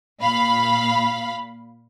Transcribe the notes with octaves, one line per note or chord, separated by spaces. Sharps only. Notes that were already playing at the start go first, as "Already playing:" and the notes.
A#2 F5 B5